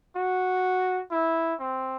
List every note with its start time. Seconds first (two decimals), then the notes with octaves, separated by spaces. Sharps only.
0.16 F#4
1.11 E4
1.59 C4